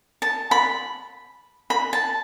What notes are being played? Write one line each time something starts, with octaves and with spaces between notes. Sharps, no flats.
A5
B5
B5
A5